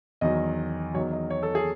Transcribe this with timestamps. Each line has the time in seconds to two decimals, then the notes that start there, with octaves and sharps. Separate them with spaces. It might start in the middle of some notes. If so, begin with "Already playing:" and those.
0.21 E2 D#3 F#3 D#5
0.94 E2 D#3 F#3 C#5
1.13 D#5
1.30 C#5
1.43 A4
1.55 G#4